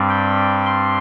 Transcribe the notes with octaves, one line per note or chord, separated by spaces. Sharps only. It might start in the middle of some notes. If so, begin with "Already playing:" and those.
Already playing: G2 G3 C4
G5
C6